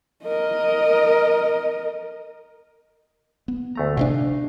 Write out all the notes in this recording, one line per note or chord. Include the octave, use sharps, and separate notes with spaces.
A#4 D#5
B3
D2 A3 A#5
C3 C4 D4 D#5 F5 G#5